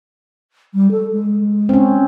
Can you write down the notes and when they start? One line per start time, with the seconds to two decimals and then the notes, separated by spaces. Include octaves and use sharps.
0.74 G3
0.91 A4
1.12 G#3
1.69 C4 C#4